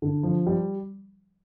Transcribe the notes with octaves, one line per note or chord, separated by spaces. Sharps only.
D3
F3
G3